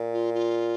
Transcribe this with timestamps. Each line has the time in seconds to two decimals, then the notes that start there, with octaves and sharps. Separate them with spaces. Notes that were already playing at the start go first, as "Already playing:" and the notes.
Already playing: A#2
0.13 F4
0.34 F4